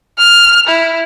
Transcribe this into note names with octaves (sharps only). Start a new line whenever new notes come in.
F6
E4